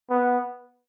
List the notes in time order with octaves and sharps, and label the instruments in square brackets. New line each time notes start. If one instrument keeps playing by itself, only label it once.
[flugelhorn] B3